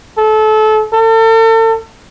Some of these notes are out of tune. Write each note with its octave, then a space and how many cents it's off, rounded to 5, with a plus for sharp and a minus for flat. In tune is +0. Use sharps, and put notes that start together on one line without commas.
A4 -25
A4 +40